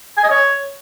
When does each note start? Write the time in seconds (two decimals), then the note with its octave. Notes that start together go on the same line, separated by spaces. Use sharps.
0.18 G#5
0.24 D#5
0.30 C#5